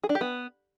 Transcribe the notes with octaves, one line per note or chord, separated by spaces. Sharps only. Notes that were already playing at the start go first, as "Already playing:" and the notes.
G#4
D4
G4
B3